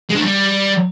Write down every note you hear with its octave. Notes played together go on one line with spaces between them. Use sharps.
G#3
D4
A3
G3